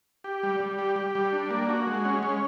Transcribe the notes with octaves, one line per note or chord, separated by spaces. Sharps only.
G4
G3
G3
G4
G4
G3
D4
A#3
F#4
G#3
C#4
G#3